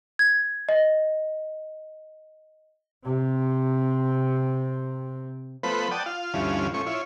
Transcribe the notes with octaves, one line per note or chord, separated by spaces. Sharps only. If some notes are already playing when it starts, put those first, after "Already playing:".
G#6
D#5
C3 C4
F3 A3 B3 B4 C5 B5
D5 F#5 G5 A5 D#6
F4 F5
D2 G2 E3 F3 C#4 F5
A2 F3 C#4 C#6
E4 F4 C#5